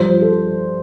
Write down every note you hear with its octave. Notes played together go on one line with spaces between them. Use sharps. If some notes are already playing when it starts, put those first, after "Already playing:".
Already playing: G2 F3 C5
A4